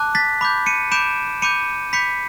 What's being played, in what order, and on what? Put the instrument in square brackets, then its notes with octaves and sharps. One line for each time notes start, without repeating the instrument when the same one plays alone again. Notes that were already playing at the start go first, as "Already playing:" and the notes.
Already playing: [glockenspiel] A5 D6 F#6
A6 B6
B5 D6 G6
C#7 D#7
B5 D6 G6 D7 E7
B5 D6 G6 C#7 D#7
B5 D6 G6 B6 C#7